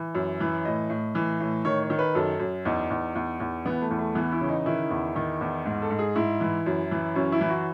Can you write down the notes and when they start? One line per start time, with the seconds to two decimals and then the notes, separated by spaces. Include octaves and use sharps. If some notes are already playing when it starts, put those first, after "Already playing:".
Already playing: E3
0.15 F#2
0.40 E3
0.65 A2 D#5
0.90 A2
1.15 E3
1.40 A2
1.65 D#3 C#5
1.82 C#5
1.90 D#3
1.99 B4
2.15 F#2 A4
2.40 F#2
2.65 E2 D#4
2.90 E2
3.15 E2
3.40 E2
3.65 E3 B3
3.81 A3
3.91 E2
3.99 A3
4.15 E3 B3
4.32 E4
4.41 C#3
4.49 D#4
4.66 D#3 E4
4.91 E2
5.16 D#3
5.41 E2
5.66 G#2
5.82 A4
5.91 G#2
5.99 G#4
6.15 G#2 E4
6.41 E3
6.66 F#2
6.91 E3
7.15 F#2 C#4
7.32 E4
7.41 E3
7.49 F#4